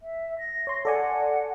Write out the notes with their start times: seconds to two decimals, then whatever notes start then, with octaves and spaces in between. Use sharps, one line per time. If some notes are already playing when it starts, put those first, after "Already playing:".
0.01 E5
0.39 A#6
0.67 C#5 C6
0.85 A4 D5 F#5 G#5